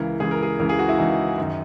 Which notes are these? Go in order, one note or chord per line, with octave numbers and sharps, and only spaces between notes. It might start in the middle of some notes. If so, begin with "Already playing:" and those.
Already playing: C#2 C#3 E3 A#4
C#2 C#3 E3 G#4
A#4
G#4
C#2 C#3 E3 A#4
G#4
F#4
E4
C#2 C#3 E3 D#4
F#2 D#3